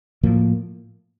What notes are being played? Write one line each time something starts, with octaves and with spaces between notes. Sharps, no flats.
A2 F3 A#3